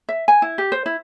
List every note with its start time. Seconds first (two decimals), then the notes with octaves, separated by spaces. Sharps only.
0.09 E5
0.28 G#5
0.42 E4
0.58 G4
0.72 C5
0.86 E4